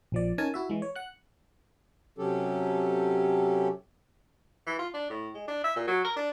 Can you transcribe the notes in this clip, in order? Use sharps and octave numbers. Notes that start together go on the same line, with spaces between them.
A#1 F3 D5
C#4 D#4 A#4 G#5 A5
E4 F#4 E5
E3 G#3
C#5
F#5 F#6
C3 F#3 C#4 G4 A4
E3
F4
D4
A2
G#3
D4
E5
A#2
F#3
A#4
D4